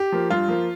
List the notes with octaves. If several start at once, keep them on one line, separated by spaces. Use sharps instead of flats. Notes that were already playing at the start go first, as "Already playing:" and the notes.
Already playing: G4
F3 A#3
G2 F4
F3 A#3